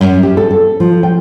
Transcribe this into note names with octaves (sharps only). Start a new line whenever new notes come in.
F#2
G4
A4
A4
F3
G5